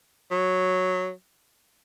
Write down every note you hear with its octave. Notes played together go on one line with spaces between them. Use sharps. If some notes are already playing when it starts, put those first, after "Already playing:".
F#3